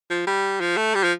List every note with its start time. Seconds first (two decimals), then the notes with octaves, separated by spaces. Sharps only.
0.10 F3
0.27 G3
0.61 F3
0.77 A3
0.95 G3
1.04 F3